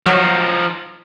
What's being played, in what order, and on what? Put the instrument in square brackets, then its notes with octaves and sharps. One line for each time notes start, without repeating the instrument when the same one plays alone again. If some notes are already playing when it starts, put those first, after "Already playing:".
[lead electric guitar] F3 D#4 [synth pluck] F#3